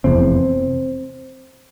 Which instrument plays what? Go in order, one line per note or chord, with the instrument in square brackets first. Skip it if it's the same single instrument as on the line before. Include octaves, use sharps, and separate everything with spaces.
[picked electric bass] F1 E2 C3 C4